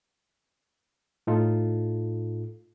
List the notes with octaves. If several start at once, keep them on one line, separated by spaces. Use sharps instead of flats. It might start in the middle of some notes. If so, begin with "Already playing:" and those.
A2 D#4 F4 A4